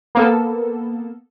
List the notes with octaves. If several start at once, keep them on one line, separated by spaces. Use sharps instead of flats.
A#3 B3 A4